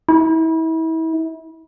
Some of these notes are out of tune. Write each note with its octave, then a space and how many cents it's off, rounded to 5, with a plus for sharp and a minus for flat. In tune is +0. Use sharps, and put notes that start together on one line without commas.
E4 -35